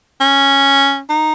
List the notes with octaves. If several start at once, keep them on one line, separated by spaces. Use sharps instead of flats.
C#4
D#4